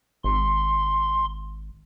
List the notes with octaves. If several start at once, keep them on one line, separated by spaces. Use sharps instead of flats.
G#1 C6